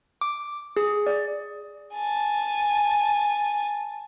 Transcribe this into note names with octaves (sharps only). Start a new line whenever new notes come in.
D6
G#4
D5
G#5 A5